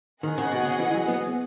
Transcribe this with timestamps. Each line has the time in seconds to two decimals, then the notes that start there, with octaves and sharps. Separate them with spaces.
0.23 D#3 G#4 D#5 F#5
0.38 C#3
0.51 B2
0.65 C#3
0.79 E3
0.94 F#3
1.08 B3